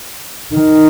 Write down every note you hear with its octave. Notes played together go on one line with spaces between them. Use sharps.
D#3